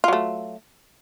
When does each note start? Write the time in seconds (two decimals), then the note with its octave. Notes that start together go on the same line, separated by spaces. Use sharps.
0.04 F4
0.08 F#3
0.13 A3